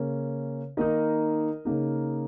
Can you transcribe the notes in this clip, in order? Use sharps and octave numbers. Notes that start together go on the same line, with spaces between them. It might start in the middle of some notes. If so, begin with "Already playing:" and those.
Already playing: C#3 A#3 C#4
D#3 A#3 D#4 A#4 D#5
C#3 A#3 D#4